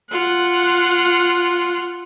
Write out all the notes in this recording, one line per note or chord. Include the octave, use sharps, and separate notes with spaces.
F4 F#5